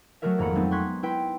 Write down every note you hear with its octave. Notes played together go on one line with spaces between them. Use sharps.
F#3 A3 F#4 G#4 A#4 E5
G#1 F2 A#3 A#5 B5 C#7
G#3 A3 B3 C4 D#4
C6 C#6 F#6 G#6 B6
E4 B4 G5 C6 B6